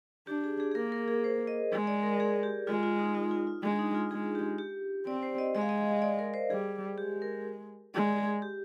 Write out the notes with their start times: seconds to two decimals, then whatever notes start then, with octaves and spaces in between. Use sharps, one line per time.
0.27 D4 G4
0.44 G#4
0.60 G#4
0.72 G#4
0.75 A#3 A#4
0.92 A#4
1.08 G#4
1.24 C5
1.47 D#5
1.71 G#3
1.87 D5
2.03 A#4
2.20 G#4
2.43 G4
2.67 G#3 F4
2.83 F4
2.99 D#4
3.15 F4
3.31 F4
3.47 F4
3.62 G#3 D4
3.79 D#4
3.95 F4
4.11 G#3 G#4
4.35 G4
4.58 G4
5.06 C4 D5
5.23 C5
5.38 D#5
5.55 G#3 D#5
5.61 F5
5.69 D#5
6.02 D5
6.19 A#4
6.34 C5
6.50 G3 G#4
6.98 G#3 G4
7.22 A#4
7.94 G#3 D5
8.18 G#4
8.42 G4